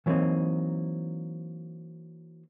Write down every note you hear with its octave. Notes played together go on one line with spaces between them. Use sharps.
E3 F#3 G3 A#3 C4 D#4